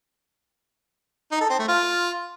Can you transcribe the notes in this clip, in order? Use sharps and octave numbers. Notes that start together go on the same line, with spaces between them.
D#4
A4
C4
A3
F4